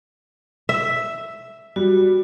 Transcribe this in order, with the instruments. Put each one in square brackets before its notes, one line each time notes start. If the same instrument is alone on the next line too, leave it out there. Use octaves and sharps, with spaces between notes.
[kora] E5
[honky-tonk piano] G3 [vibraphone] F#4